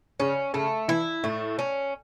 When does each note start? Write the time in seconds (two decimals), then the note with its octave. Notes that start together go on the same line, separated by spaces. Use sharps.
0.20 C#3 C#4
0.54 C#3 A3
0.88 E3 E4
1.24 A2 A3
1.59 C#4